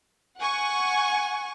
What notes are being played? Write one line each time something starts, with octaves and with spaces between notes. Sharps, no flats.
F#5 G#5 C#6